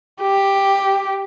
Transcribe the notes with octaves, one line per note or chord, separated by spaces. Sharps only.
G4